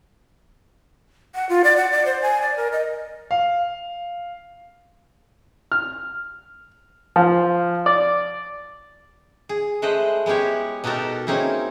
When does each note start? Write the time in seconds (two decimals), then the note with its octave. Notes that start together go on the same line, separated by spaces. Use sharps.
1.35 F#5
1.49 F4
1.64 D5
1.77 F#5
1.92 D5
2.05 C5
2.22 G#5
2.42 D5
2.57 A#4
2.72 D#5
3.31 F5
5.72 F6
7.16 F3
7.86 D5
9.49 G#4
9.82 G#3 A3 B4 C5 D#5
10.26 G#3 B3 E4 G4 C#5
10.84 B2 D#4 F#4 G4 A4 A#4
11.27 A#3 C4 C#4 D#4 E4 G#4